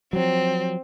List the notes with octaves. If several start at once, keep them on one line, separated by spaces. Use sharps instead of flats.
F3 F#3 C4